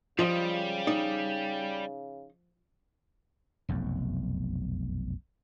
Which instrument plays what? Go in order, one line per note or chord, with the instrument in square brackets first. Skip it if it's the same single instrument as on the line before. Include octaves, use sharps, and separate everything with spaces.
[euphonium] C#3 [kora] F3 [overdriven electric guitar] G3 [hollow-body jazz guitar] F4 D#5
[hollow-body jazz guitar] D#4 D5
[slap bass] F1 B1 F#2